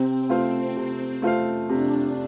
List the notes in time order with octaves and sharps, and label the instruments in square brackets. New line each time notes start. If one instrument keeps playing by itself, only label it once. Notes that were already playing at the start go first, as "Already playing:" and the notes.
Already playing: [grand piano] C3 [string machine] C4
[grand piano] A3 F4 C5 F5
C3
A3 F4 C5 F5
[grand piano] C3 [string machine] D4